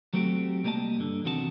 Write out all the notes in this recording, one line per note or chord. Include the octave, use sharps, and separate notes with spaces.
F#3 A3 C4 F#4 G4
C2 G3 A#3 B4 D#5 A5
G2 D3
E2 C3 D#3 F#4 B4 A5